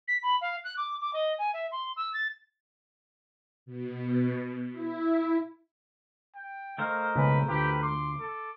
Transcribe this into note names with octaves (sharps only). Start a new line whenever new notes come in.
B6
B5
F5
F#6
D6
D6
D#5
G#5
E5
C6
E6
A6
B2
E4
G5
A3 A#4 C5 D#5 F5
B1 C#3 G#3 B4
D2 F4 G4 B4
C6 D6
A4